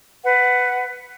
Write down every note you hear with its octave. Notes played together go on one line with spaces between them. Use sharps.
B4 F#5